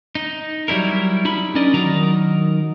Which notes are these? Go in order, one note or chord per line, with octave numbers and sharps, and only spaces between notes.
D#4
F#3 G3 E4 A#4
D#4 E4 B5
C#4 D4 A#4 D5 D#5
D#3 F#3 D#4 A#4 A#5